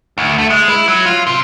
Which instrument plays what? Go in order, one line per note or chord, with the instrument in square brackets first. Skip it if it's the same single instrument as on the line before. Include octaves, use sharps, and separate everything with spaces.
[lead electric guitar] D2
A3
G#3
E4
F#3
F4
C3